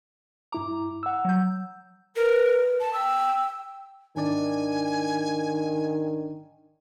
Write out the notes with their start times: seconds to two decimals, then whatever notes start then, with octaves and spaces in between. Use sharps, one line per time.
0.52 G2 E4 A#5 D6
1.03 F#5 E6
1.25 F#3 G6
2.16 A#4 B4
2.80 A5
2.94 G5 E6
4.16 G#1 D#3 D4 D5 G#5